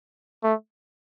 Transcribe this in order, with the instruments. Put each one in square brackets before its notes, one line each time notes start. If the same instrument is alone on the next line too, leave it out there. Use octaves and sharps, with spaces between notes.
[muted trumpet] A3